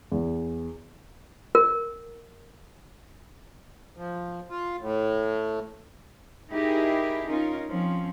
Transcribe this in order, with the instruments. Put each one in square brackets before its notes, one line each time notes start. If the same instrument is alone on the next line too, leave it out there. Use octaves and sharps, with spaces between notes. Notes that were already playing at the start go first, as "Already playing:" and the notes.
[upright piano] E2
[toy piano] A#4
[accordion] F3
F4
A2
[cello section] D#4 E4 G4 G#4 A#4 D#5
C#4 D#4 F4 A#4
F3 C4 C#4